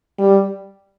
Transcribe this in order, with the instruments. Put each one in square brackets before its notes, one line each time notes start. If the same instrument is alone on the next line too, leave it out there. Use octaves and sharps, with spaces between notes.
[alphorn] G3